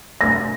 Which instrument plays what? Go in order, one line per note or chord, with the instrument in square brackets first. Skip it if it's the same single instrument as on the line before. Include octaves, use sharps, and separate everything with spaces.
[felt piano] A#6